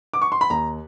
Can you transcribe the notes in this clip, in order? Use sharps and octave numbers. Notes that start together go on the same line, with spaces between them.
D6
C#6
C6
B5
D#2 A#5